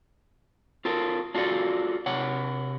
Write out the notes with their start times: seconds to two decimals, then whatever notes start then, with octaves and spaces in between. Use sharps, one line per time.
0.85 F4 A4 A#4
1.35 D4 F4 F#4 A4 D5
2.06 C3 C#5 F#5